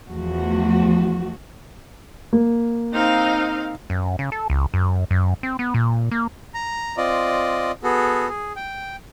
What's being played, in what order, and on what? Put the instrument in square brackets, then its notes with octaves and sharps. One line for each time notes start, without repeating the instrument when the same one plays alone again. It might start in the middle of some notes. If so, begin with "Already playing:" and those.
[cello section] E2 F3 A3 F#4
[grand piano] A#3
[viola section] C4 D#4 F5
[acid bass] F#2
C#3
A4
C#2
F#2
F#2
C4
B3
A#2
A#3
[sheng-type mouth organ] A#5
C4 F4 D5 D#5
B3 F#4 G#4 A4
G#4
G5